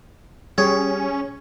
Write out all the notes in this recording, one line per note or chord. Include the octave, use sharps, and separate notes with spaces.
G3 C#4 G#4 C#5